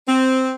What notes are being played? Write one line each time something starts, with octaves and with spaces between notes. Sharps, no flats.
C4